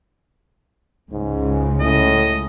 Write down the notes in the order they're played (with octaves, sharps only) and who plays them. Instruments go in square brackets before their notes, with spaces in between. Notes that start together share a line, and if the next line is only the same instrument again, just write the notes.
[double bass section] C#2 C#3 G#3 [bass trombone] G#2
[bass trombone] A2 [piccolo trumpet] D#5